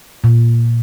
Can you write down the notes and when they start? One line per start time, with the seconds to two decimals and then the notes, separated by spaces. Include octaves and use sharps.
0.24 A#2